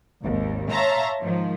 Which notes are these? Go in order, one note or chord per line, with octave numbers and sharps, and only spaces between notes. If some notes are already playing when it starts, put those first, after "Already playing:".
G#1 D#2
C#5 E5 F5 A5 A#5 C6
G#2 D#3 F3